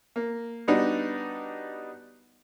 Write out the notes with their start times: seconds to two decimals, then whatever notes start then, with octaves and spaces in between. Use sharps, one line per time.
0.16 A#3
0.68 G3 B3 D4 D#4 F#4